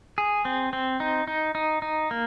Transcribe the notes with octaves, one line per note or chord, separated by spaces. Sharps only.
G#4
C4
C4
D#4
D#4
D#4
D#4
A#3